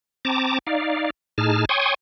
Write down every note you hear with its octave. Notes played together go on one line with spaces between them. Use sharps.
C4 A5 A#5 D6
D#4 D5 F5
A2 D#4 G#4 A5 F6
C#5 G5 G#5 C6 C#6 D#6